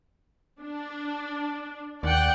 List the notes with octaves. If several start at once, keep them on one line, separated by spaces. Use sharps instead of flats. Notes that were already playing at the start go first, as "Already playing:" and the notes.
D4
D#2 D5 F#5 G5